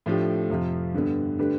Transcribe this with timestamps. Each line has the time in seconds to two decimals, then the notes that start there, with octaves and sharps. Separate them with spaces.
0.06 A2 F3 A3 D4 G4
0.50 F2 C3 F3
0.94 G2 D3 G3 B3
1.39 D3 A3 D4 G4 B4